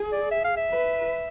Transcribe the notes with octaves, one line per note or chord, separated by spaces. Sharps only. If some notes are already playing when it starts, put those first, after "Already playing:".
Already playing: G#4
D5
E5
F5
E5
B4